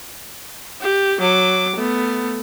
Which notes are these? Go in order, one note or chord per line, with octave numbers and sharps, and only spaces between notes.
G4
F#3 D6
A3 B3